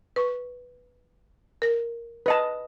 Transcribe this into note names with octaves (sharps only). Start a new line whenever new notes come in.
B4 C#6
A#4 A#6
B4 D#5 A5